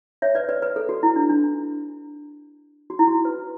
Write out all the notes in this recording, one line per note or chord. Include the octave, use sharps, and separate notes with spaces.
C#5 E5
B4 D5
B4 D5
B4
A4
F#4
E4
D4
D4
F#4
E4
F#4
B4